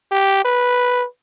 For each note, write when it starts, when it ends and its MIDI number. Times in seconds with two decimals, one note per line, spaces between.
0.12 0.44 67
0.45 1.05 71